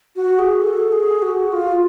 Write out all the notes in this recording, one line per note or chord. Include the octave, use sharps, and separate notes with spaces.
F#4
G#4
A4
G#4
F#4
F4